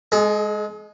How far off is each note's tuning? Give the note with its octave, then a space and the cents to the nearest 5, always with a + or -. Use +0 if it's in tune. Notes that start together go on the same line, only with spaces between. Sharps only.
G#3 +0 G#4 +45